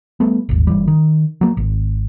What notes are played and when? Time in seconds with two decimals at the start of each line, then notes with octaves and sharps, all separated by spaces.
0.20 G3 A3 B3
0.49 D#1 G#1
0.67 G1 E3 G3
0.88 D#3
1.41 F#3 A#3
1.57 G#1